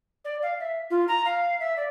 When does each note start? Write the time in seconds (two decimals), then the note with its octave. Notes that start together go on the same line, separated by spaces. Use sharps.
0.25 D5
0.42 F5
0.60 E5
0.90 F4
1.08 A#5
1.25 F5
1.60 E5
1.77 D5